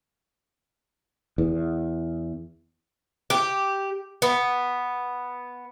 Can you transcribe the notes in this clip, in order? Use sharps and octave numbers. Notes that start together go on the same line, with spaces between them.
E2
G4
B3